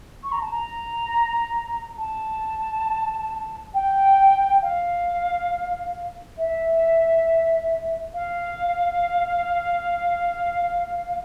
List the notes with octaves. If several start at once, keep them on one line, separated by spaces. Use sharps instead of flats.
C#6
A#5
A5
A#5
A5
G5
F5
E5
F5